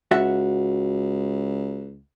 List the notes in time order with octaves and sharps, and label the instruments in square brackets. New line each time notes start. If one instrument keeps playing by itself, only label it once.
[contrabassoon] C#2 [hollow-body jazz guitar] F#4 E5 F#5